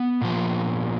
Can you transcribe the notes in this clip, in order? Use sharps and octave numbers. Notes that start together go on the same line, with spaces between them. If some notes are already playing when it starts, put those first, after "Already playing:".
Already playing: B3
A#2 F3